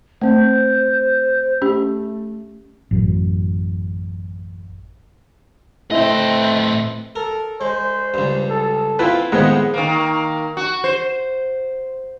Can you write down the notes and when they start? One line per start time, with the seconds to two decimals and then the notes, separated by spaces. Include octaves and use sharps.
0.21 A3 C4 C5
1.62 A3 C#4 G4
2.91 A1 F#2
5.91 A2 A3 C4 E4 B4 D#5
7.16 A4 A#4
7.61 G#3 C5
8.14 C#2 G2
8.50 A4
8.99 B3 C4 E4 F4 B4
9.32 A2 D#3 F3 G#3 B3 C4 F#5
9.74 D#3 A#3
10.57 F#4
10.84 C5